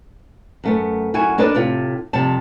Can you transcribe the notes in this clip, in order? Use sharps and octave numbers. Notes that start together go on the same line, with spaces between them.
F#2 A3 B3
F#2 E4 F#4 G#5
A#3 D4 A4 B4 D5 D#5
A2 C3 F4
F2 C3 G3 A5